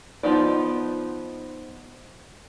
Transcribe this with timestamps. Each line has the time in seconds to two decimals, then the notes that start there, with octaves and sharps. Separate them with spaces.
0.23 F3 B3 D#4 D5